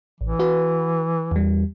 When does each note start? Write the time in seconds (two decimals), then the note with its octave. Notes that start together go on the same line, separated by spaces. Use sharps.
0.21 A1 E3
0.39 F#4 B4
1.31 E2 G3